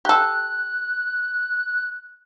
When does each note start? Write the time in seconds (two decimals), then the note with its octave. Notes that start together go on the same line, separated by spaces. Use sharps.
0.05 G4 A4 F#6